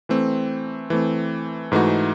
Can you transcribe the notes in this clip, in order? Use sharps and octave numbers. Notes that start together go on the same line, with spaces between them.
E3 A3 C4
E3 A3 C4
G#2 E3 A3 D#4 F#4